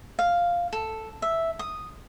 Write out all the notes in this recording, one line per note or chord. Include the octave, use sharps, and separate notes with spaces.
F5
A4
E5
D#6